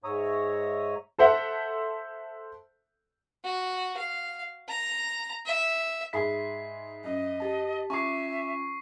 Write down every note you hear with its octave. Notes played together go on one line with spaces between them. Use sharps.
G#2 C#5 E5 A#5 D#6
A4 C5 E5 F#5
F#4
F5
A#5
E5
G#2 G#4 E5 G#5 B5 B6 C7
F#2 D#5
G4 A5
C#4 F4 E5 G#5 A#5 C#6 D6 C7